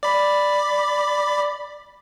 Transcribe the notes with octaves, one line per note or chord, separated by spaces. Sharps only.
D5 B5